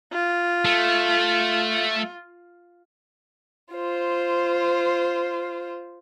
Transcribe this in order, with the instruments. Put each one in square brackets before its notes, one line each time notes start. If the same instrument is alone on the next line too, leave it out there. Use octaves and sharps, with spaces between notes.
[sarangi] F4
[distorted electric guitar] A3
[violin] F4 C5